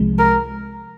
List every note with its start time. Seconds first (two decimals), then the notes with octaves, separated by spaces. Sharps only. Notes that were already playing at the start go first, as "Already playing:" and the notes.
Already playing: C2 C3 F3 G#3
0.19 A#4